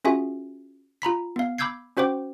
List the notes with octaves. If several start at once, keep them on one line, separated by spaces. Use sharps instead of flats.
C#4 F4 F#4 G#4 E5 G#5
F4 A#5 B5 B6
B3 F5
B5 D6 E6 G6 G#6 C7
C#4 F#4 C5 G5 D6